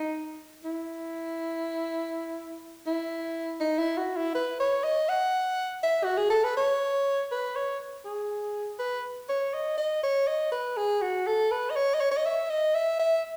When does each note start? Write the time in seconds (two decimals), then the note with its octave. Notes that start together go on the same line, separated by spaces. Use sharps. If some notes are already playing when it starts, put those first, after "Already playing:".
Already playing: D#4
0.64 E4
2.86 E4
3.60 D#4
3.79 E4
3.97 F#4
4.16 E4
4.35 B4
4.60 C#5
4.84 D#5
5.09 F#5
5.83 E5
6.04 F#4
6.17 G#4
6.30 A4
6.44 B4
6.57 C#5
7.32 B4
7.56 C#5
8.05 G#4
8.79 B4
9.29 C#5
9.54 D#5
9.77 D#5
10.03 C#5
10.28 D#5
10.52 B4
10.77 G#4
11.02 F#4
11.27 A4
11.51 B4
11.70 D#5
11.76 C#5
11.94 D#5
12.00 C#5
12.11 C#5
12.17 D#5
12.25 E5
12.50 D#5
12.74 E5
12.99 E5